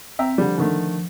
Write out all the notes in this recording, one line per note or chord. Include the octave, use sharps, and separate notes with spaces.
C4 E5 G5 A#5
D3 F3 G3
D3 D#3 A3